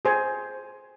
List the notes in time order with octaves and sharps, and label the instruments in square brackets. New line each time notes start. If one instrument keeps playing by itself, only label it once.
[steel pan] G#4 C5 G#5